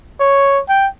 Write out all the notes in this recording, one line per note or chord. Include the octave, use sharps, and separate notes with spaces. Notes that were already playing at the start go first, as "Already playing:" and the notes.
C#5
G5